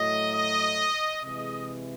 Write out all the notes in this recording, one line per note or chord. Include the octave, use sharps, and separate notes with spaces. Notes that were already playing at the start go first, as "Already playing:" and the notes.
Already playing: A2 F#3 A3 D#5
D#5
C3 E3 G#3 D#5